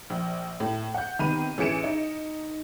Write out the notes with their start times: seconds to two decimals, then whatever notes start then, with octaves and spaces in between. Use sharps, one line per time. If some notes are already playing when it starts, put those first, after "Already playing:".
0.10 A#1
0.60 A2
0.94 F#5 G6
1.19 C3 D#3 B3 B5 D#7
1.58 A1 E3 G#4 C#7 D7 E7
1.84 D#4 D#5